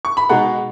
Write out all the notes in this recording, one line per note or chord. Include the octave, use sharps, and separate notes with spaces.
C#6
B5
B2 G#3 D#4 F#5 A#5